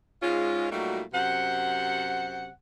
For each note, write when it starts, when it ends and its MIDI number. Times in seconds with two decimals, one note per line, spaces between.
0.22 0.66 44
0.22 0.66 56
0.22 0.66 61
0.22 0.66 65
0.71 1.01 46
0.71 1.01 54
0.71 1.01 55
0.71 1.01 57
0.71 1.01 63
0.71 1.01 66
1.14 2.49 42
1.14 2.49 48
1.14 2.49 72
1.14 2.49 78